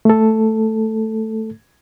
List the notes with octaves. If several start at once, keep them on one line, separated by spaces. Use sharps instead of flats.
A3 A4